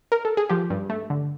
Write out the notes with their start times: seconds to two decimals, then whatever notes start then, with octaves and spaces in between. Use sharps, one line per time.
0.12 A#4
0.25 A4
0.37 G#4
0.49 F3 G4
0.70 G2
0.90 A3
1.10 D3